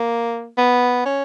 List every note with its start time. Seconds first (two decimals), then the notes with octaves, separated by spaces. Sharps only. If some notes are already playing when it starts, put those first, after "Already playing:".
Already playing: A#3
0.57 B3
1.05 C#4